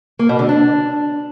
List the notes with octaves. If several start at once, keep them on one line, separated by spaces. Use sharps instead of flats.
A#3
B2
D3
D4